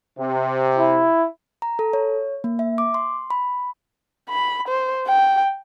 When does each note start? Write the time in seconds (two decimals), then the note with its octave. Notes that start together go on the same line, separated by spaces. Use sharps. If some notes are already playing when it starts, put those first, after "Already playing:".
0.18 C3
0.78 E4
1.62 A#5
1.79 A4
1.93 C#5
2.44 A#3
2.59 E5
2.78 D6
2.94 C6
3.30 B5
4.30 B5
4.68 C5
5.07 G5